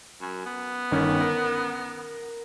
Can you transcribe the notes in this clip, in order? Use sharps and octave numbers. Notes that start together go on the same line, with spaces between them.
F#2
B3
G1 D#3 C#4
A#4